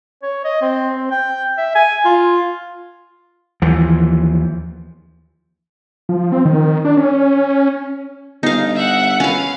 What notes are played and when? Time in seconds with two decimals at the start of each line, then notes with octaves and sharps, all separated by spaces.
0.22 C#5
0.45 D#5
0.61 C4
0.94 C4
1.11 G5
1.58 E5
1.75 G#5
2.05 F4
3.62 D#2 E3 F3
6.09 F3
6.32 C4
6.45 D#3
6.85 D4
6.97 C#4
8.43 G1 D#4 F5
8.76 E5 F#5
9.20 C#4 B4 F5